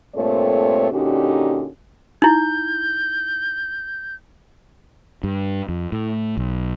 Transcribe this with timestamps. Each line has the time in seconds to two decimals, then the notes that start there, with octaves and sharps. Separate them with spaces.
0.15 G2 A#2 A3 C4 A4 C#5
0.91 A#2 D3 C#4 D#4 F#4 G4
2.22 D#4 E4 G6
5.24 G2
5.69 F2
5.92 A2
6.37 B1